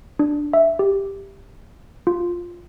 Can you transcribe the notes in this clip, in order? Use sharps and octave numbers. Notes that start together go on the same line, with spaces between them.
D4
E5
G4
F4